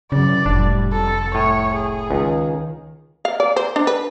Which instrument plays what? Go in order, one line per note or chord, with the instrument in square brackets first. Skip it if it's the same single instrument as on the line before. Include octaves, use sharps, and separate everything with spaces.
[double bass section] F#2 E3 F#3 [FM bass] C#3 [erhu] D5
[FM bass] F1 [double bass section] A2 F3 G3 [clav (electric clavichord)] D4
[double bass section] C2 F2 [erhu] A4
[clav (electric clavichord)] A2 G#5 [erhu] C#5
[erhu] G#4
[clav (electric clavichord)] C#2 [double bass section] D#3
[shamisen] F5
D5
C5
D4
B4